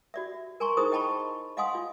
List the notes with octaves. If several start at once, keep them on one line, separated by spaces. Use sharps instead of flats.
F#4 D5 E5
A#4 G#5 A#5 C6 C#6
D#4 E4 G#4 A#4 C5 D#6
D#5 G5 A5 B5 C#6
D#5 F5 F#5 G#5 C6 D#6
F4